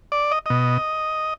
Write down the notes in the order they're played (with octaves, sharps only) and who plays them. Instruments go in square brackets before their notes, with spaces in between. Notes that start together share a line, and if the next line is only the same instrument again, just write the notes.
[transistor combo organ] D5
D#5
B2 D#5